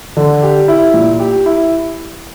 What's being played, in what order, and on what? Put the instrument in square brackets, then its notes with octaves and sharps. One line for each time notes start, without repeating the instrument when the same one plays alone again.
[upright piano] D3
G4
E4
A#2
G4
E4